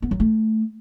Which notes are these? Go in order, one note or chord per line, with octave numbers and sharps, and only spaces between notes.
B3
F#3
A3